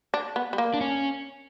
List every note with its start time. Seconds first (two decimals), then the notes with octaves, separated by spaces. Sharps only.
0.14 D4
0.36 B3
0.53 G3
0.58 A#3
0.74 D4
0.81 C#4